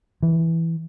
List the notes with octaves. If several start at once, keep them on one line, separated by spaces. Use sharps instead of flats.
E3